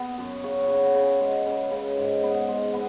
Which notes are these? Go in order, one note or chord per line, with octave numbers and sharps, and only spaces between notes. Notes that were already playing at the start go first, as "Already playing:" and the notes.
Already playing: B3 G#4
F#2
C#3 C#5
F#5
C#3
F#5
C#3
G#5
G#3 F#5
C#3
C#3
G#2
B3
G#3
B3 F#5